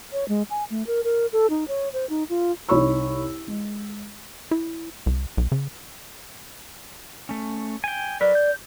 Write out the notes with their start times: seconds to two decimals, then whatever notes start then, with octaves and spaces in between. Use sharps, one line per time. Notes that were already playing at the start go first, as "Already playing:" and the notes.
0.13 C#5
0.28 G#3
0.50 G#5
0.70 A3
0.87 A#4
1.04 A#4
1.33 A4
1.50 D#4
1.68 C#5
1.93 C5
2.09 D#4
2.29 F4
2.69 C2 D#4 C#5 B5 C#6 E6
3.47 G#3
4.51 E4
5.06 C2
5.37 B1
5.52 C#3
7.29 A3 C#4
7.84 G5 G#5
8.21 F#3 A#4 B4 D5
8.35 G6